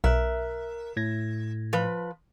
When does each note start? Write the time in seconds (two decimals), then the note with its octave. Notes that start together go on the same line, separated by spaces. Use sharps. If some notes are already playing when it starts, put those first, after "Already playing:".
0.04 B1 A#4 E5 F#6
0.97 A2 G#6 A#6
1.73 F3 B4